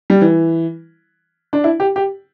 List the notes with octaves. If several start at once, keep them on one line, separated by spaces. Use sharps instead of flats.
G3
E3
D4
E4
G4
G4